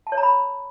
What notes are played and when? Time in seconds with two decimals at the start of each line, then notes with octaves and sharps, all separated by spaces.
0.07 A5
0.12 C#5
0.18 A#5
0.23 B5